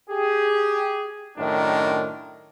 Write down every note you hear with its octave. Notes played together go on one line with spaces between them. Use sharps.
G4 G#4
F#2 A2 D#3 D4 A#4